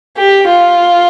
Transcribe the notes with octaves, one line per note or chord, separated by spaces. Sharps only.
G4
F4